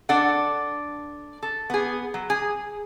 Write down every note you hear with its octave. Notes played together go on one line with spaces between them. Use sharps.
D4 A4 D5 F#5
A4
B3 G#4
F#3
G#4